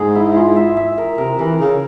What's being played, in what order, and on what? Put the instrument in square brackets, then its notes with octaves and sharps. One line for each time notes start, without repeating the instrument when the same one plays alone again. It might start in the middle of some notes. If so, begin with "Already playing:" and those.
Already playing: [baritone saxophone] G#2 [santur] G#4
[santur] E4
F4
E5
E5
A#4
[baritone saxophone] C3 [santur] A#4
[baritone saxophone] E3 [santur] A#4
[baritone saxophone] C#3 [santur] A#4